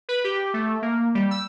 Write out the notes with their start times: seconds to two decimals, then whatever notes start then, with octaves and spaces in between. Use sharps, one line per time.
0.09 B4
0.24 G4
0.54 A3
0.82 A#3
1.15 G3
1.31 E6